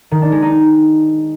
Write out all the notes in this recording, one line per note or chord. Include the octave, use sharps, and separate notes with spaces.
D#3
D4
G#3
D#4